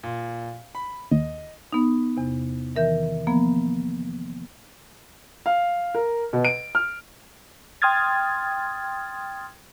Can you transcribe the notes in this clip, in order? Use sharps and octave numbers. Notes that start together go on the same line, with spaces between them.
A#2
B5
D#2 D#5
B3 D#4
E2 C3
D#3 E3 A#4 E5 G6
F3 A#3 B3
F5
A#4
B2
D7
F6
G5 C6 D#6 F6 G#6 A6